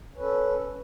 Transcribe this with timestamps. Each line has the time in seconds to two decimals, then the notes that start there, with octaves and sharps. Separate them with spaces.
0.13 C#4
0.17 B4
0.20 A4